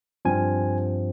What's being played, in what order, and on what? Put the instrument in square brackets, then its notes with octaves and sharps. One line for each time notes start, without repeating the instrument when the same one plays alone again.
[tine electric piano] G2 F3 C4 G#5